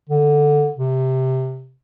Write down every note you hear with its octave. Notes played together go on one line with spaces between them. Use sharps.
D3
C3